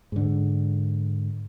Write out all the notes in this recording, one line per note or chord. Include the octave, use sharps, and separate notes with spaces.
G#2 D3